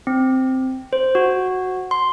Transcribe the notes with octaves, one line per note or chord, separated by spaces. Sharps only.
C4
C5
F#4
C6